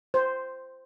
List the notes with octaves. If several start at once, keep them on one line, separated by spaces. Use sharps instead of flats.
C5